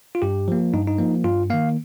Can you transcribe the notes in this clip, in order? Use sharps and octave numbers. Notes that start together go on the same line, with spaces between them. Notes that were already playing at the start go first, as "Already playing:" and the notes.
F4
G2 G4
F3 A#3
G2 D#4
D#4
F3 A#3
G2 F4
D#3 A#3 F5